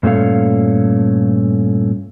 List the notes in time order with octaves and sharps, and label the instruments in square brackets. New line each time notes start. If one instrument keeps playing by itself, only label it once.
[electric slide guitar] G2 A#2 A3 C#4 A4 F5